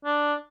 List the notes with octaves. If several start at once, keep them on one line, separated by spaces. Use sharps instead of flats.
D4